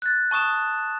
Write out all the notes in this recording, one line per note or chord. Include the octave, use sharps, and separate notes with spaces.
F#6 A6
A5 C#6 D#6 E7